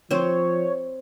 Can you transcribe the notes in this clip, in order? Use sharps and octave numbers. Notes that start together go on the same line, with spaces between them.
F3 C4 C5 C#5